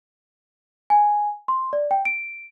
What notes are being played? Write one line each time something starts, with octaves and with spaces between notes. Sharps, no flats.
G#5
C6
D5
G5
D7